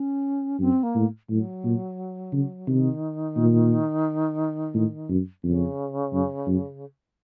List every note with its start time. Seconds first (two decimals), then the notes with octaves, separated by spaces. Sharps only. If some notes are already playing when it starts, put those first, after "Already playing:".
Already playing: C#4
0.60 F#2 C4
0.83 A#3
0.95 A2
1.29 A2 F#3
1.64 A#2
2.33 C#3
2.67 C3 D#3
3.37 A#2
4.75 A2
5.09 F#2
5.44 F2 C#3
6.13 F#2
6.47 F#2